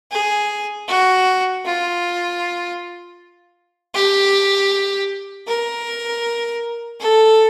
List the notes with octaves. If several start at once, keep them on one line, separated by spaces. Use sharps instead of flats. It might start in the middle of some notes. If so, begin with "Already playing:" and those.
G#4
F#4
F4
G4
A#4
A4